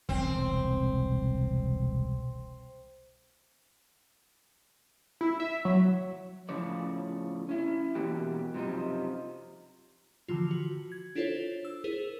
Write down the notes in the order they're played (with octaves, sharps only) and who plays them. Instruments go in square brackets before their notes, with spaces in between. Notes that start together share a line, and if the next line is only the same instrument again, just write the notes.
[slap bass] E1 C2 [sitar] C4
[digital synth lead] E4
E5
F#3
[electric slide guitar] A2 C#3 F3 C#5 D5
C#4 E4
B2 E3 A#3 F#4 G4
F#2 C3 F3 D#4
[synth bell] D3 E3 F3 F4
F#4
G#6
D4 E4 F4 A4 C5 C#5
E6
E4 G#4 A#4 C5